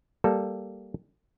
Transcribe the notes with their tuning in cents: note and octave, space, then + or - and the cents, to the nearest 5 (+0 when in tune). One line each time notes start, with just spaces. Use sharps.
G3 +0 A#3 +0 A4 +0